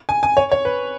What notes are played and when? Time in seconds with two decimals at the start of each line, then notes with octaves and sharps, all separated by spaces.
0.09 G#5
0.23 G#5
0.37 C#5
0.52 C#5
0.65 B4